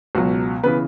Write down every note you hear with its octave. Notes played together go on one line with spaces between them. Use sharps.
C#2 B2 F#3 F#4
C#3 E3 B3 B4